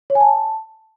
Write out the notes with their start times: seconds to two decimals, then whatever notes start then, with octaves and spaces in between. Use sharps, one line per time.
0.10 C#5
0.15 G#5
0.21 A5